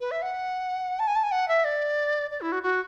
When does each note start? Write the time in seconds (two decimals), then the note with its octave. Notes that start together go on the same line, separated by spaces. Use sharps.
0.01 B4
0.11 E5
0.22 F#5
0.99 A5
1.08 G#5
1.16 A5
1.23 G#5
1.32 F#5
1.48 E5
1.65 D5
2.31 D5
2.41 E4
2.52 F#4
2.63 F#4